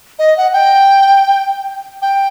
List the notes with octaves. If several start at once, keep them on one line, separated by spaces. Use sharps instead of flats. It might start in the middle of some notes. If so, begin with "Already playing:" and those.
D#5
F#5
G5
G5